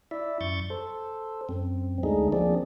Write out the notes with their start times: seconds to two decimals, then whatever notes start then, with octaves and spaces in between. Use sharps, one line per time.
0.11 E4 D5 E5
0.41 F#2 C#6 G6 A6
0.70 A4 C5
1.49 F#2 C4
2.03 D2 G#3 A3 D4 D#4 G#4
2.33 F3 A#3 C4 D4 G#4 D5